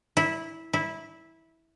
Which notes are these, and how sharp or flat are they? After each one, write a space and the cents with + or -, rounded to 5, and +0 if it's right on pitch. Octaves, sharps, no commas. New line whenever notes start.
E4 -15
E4 -15